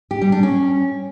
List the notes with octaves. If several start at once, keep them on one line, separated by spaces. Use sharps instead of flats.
G4
G3
D4
C#4